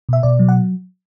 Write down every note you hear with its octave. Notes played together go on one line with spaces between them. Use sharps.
B2 E5
B2 D5
F#3
F#5